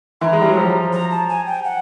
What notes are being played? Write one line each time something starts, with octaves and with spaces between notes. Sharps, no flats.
E3 A#5 C6
G#3
G3
F#3
F3
A#5
A5
G#5
G5
F#5